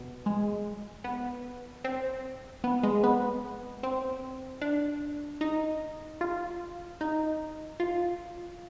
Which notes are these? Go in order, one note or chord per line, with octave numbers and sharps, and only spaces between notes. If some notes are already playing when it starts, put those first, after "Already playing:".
Already playing: B2
G#3
B3
C4
B3
G#3
B3
C4
D4
D#4
F4
D#4
F4